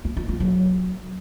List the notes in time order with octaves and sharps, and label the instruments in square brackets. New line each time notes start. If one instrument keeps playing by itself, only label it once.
[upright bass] A#3
F4
A#3
F#3